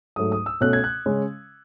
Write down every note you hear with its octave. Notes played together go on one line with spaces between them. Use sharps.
G#2 F#3 A3 D#6
D#6
E6
B2 A3 C#4 F#6
G#6
F#6
C#3 G#3 C#4